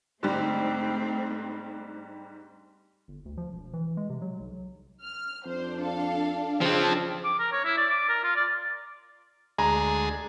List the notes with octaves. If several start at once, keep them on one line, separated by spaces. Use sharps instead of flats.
G#2 D3 G3 A3 C4
G1
D2
F3
E1
E3
G#3
C3
F#3
B1
F6
F2 D4 C5
A4 F5
C#3 F3 C4 A5
D6
A#4
C#5
E4
D5
D6
A#4
F4
D5
D2 D3 G#3 G#4 A#5